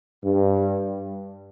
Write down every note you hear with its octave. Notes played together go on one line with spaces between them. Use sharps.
G2